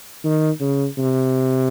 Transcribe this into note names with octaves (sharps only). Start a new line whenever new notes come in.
D#3
C#3
C3